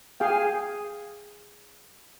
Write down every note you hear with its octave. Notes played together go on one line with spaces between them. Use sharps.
G#4 F5 G5